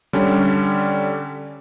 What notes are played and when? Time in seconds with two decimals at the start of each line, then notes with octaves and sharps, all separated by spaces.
0.13 D3 G3 C#4